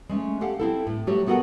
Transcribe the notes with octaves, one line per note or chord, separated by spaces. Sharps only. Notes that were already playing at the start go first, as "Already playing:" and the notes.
G#3 A3 C#4
G4 A4 F5 F#5
C4 E4 A4
A2
F#3 A3 F#4 G4 C#5
F#3 B3 F#4 A4 A#4 F#5